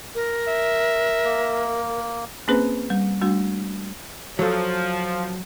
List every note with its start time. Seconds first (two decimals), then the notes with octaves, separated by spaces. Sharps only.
0.15 A#4
0.48 E5
1.24 A#3
2.48 A#3 C4 C#4 G#4 B4 C5
2.90 G3
3.22 G3 A3 D4 F#4
4.39 F3 F#3 A4